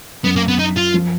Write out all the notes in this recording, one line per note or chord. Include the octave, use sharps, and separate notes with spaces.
F#2 B3
A#3
B3
D#4
F4
F3